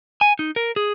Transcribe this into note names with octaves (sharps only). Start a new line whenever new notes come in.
G#5
D#4
A#4
G#4